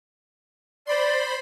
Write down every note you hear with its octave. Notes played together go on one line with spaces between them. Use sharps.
C5 D5 B5 C6